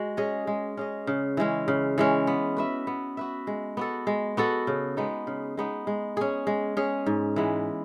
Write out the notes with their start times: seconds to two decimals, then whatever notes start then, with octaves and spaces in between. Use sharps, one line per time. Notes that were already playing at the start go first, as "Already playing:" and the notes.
Already playing: G#3 F#4
0.17 C#4 G#4 D#5
0.47 G#3
0.77 C#4 G#4 D#5
1.07 C#3
1.37 E3 G#3 C#4
1.68 C#3
1.98 E3 G#3 C#4
2.27 B3
2.57 F#4 B4 E5
2.87 B3
3.17 F#4 B4 E5
3.47 G#3
3.77 B3 F#4 A4
4.07 G#3
4.37 B3 F#4 A4
4.67 C#3
4.97 G#3 B3 D#4
5.27 C#3
5.57 G#3 B3 D#4
5.87 G#3
6.17 C#4 G#4
6.47 G#3
6.77 C#4 G#4
7.06 G#2
7.36 E3 G#3 B3